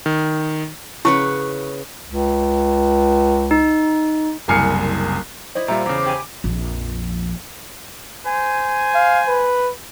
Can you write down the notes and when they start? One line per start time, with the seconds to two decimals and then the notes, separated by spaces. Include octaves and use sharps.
0.06 D#3
1.05 C#3 E4 B4 F#5 C#6
2.06 C#2
3.51 D#4
4.48 F#1 C2 G#5 F6 C7 C#7
5.55 E4 C5 D5 D#5
5.68 A#2 G3 F4 E5 A#5
5.86 E2 C#3 D6
6.05 G4 B4 G#5
6.44 A#1 F2
8.25 C5 G#5
8.95 F5
9.28 B4